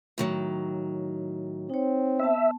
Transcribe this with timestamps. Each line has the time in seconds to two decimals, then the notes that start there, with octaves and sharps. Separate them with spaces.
0.18 A2 D#3 F#3
1.70 C4 D#4 C#5
2.19 B3 E5 A5